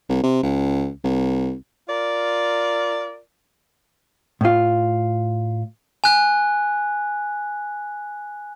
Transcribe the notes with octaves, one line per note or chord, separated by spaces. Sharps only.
C2
C3
C#2
C2
F4 A#4 D5
A2 F4
G#5 F#6